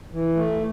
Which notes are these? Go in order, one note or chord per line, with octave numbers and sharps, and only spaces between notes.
E3
A3